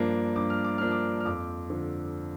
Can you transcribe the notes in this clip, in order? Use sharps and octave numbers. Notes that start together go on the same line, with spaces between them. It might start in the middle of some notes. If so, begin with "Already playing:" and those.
Already playing: G2 F3 A#3 D4
G2 D6
F6
D6
F3 A#3 D4 F6
D6
F6
F2 D6
D3 F3